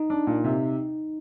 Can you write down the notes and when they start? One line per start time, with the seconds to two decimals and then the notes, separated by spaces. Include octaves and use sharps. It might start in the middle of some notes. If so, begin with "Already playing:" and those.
Already playing: D#4
0.10 D4
0.27 A#2
0.44 C3